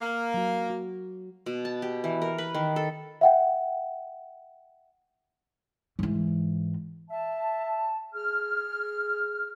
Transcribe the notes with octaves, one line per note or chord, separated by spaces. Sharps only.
A#3
F#3 F#4
F#4
B2
A5
G4
E3
A#4
B4
D#3
A4
E5 F#5 G5
G#2 E3
E5 A5
G#4 F6